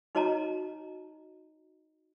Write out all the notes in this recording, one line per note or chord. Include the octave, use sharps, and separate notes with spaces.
D#4 F#4 C#5 D#5 A5 A#5